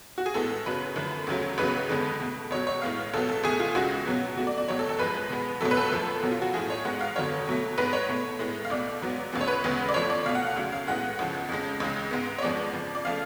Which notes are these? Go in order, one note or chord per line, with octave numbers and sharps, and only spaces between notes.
F#4
G#4
A2 G#3 B3 A4
A4
F#2 C#3 F#3 B3 B4
F#2 D3 F3 A3
D2 C#3 F#3 A3
C#2 C#3 F#3 B3 B4
F2 D3 G#3 B3
B2 A3
C#2 B2 F#3 C#5
C#5
A2 G#3 B3 F5
C#2 B2 F#3 B3 A4
A4
C#2 B2 A3 G#4
F4
C#2 C#3 G#3 F#4
B2 F#3 B3
B2 A3 F#4
D5
D5
C#2 B2 F#3 A3 C#5
A4
A4
F#2 F3 G#3 B4
B2 G#3 B3
C#2 B2 F#3 A3 A4
B4
A4
F#2 F3 A3
B2 F#3 B3
F4
F#4
A2 F3 A3 G#4
C#5
G#2 G#3 B3 F#5
F5
F2 D3 F#3 B3 C#5
B2 F#3 A3
G#2 G#3 B3 B4
C#5
B2 A3
A2 G#3 B3
F5
C#2 B2 A3 D5
G#2 F#3 B3
D2 C#3 F3 B3
C#5
B4
D2 C#3 G#3 B3
D5
F2 F3 A3 C#5
D5
B2 A3 F5
F#5
F5
D2 C#3 F#3 A3
F5
A2 G#3 B3 F#5
C#2 C#3 F3
F2 C#3 G#3
C#2 C#3 G#3
G#2 G#3 B3
C#5
F2 F3 G#3 B3 D5
F2 C#3 F3
D5
C#3 F3 A3 F5